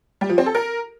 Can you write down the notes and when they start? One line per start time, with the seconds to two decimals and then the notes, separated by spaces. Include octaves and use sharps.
0.21 G3
0.30 F3
0.38 C4
0.46 A4
0.55 A#4